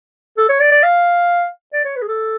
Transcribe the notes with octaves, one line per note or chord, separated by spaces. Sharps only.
A4
C#5
D5
D5
F5
D5
C#5
B4
G#4
A4